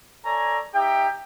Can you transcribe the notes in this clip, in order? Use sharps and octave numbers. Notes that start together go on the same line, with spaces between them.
A4 C#5 D5 G#5 A#5
D#4 G4 E5 G5